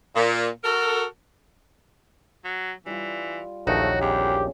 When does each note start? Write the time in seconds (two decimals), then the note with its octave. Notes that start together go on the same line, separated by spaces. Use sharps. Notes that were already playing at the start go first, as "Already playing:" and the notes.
0.15 A#2
0.64 F#4 A4 A#4
2.44 F#3
2.86 E3 G3 F4
3.67 A#1 D#2 F#3 A3 D#4 F#4
4.01 E2 C#3 G3 G4